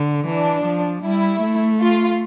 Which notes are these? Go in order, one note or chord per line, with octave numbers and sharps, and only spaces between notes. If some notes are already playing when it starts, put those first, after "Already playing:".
Already playing: D3
E3 D4
F3
G3 E4
A3
F4